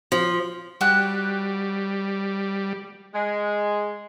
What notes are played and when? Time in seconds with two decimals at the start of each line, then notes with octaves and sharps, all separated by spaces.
0.12 F3
0.81 G3 F#4 G5 F#6
3.14 G#3